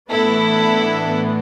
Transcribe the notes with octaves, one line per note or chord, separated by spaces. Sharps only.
A2 E3 B3 D4 E4 A4